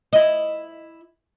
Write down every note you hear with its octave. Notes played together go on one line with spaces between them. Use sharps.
E4 D#5